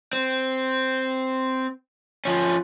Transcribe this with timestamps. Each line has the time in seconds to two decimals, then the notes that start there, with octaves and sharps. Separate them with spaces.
0.13 C4
2.25 F3 C#4